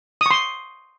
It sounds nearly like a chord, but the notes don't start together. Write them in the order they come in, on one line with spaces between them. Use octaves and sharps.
D#6 C#6 C6